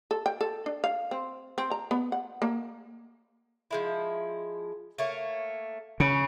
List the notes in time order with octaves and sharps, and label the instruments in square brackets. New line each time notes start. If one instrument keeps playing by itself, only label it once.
[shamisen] A4
G5
A4
D4
F5
C4
C4
A#5
B3
F#5
A#3
[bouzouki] F3 G#3 E4
A3 A#3 C#5
[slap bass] C#3 [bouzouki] B4 C#5